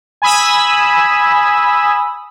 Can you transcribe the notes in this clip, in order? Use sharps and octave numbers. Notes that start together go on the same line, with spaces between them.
G#5 B5 D#6 E6